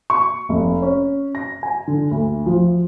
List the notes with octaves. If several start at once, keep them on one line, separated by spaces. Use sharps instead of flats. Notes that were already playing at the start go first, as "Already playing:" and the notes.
C#6
F1
C#4
A#6
G#5
D3
D2
F3